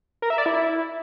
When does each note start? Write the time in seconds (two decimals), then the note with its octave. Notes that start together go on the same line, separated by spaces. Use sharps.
0.22 A#4
0.30 E5
0.38 D5
0.46 E4